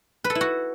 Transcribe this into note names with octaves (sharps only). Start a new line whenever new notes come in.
B4
A4
E4
F#4